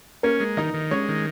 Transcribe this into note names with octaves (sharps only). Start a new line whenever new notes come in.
A#3 C#4 A#4
G#3
D#3 D#4 D#5
D#3
G#3 C#4 C#5
D#3